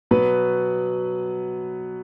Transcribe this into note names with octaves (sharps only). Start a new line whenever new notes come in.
B2 F#3 B3 B4